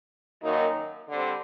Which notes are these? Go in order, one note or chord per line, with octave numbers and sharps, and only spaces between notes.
F#2 D#3 F#3 A#3 D#4
D3 G3 C4